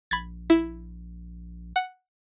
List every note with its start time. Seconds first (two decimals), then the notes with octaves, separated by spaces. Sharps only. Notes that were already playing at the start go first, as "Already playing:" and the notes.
0.11 A#1 B5 G#6 A6
0.50 E4
1.76 F#5